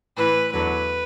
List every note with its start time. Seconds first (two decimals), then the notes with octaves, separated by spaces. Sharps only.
0.17 A2 E3 B4
0.53 E2 D3 F#3 B4